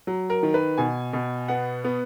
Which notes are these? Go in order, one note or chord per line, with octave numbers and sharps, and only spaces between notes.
F#3
A#4
D#3
B4
B2 G#5
B2
B3 F#5
B3